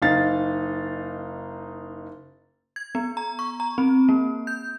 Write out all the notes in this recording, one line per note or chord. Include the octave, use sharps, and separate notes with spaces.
F#1 D#4 F5 A6
G#6
B3
A#5
C#6
A#5
C4
A#3
G6